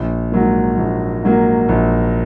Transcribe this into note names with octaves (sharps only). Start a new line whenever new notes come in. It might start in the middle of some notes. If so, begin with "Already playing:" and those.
Already playing: A#1
G#2 F#3 A#3
A#1
G#2 F#3 A#3
A#1